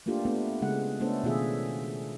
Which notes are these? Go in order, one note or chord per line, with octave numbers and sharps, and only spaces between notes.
A3 A#3 D4 F4 G4
A3 B3 D4
C#3 G#3 F#5
A3 B3 C#4 D4 A4 C5
B2 D#3 A3 F4 G#4 E5